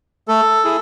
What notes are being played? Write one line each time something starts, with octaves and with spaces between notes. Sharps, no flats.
A3 A4
E4 G#4